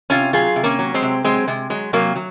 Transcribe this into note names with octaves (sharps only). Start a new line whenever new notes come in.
C3 C#4 F4
F#3 F4 G#4
C3
A#3 C#4
F#3
G#3 C4
C3
F#3 G#3 C4
C3 G#3
F#3 G#3
C3 F#3 A#3
F#3